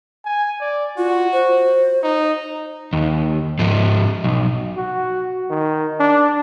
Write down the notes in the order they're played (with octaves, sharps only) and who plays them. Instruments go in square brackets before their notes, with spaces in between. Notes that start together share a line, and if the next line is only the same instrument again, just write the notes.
[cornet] G#5
D5
[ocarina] F4 [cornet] F#4
[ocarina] C5
[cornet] D#4
[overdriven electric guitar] D#2
G#2 F3
B1
[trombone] F#4
D#3
D4